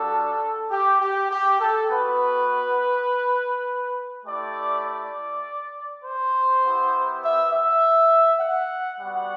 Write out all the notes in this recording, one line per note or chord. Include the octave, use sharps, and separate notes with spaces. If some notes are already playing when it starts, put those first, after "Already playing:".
Already playing: G3 D4 F#4 A4
G4
G4
G4
A4
B3 F#4 B4
A3 E4 G4 D5
D5
C5
B3 E4 G4
E5
E5
F#5
G3 B3 F#4 F#5